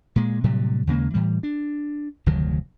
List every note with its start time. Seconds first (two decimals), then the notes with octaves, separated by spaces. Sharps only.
0.16 A#2 G#3
0.44 A2 C3 F#3 G3
0.87 D#2 C#3 G#3 A#3
1.14 A2 E3 G3
1.43 D4
2.26 F1 D2 D#3 F#3